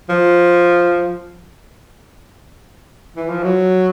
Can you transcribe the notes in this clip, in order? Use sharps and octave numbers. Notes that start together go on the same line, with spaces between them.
F3
E3
F3
F#3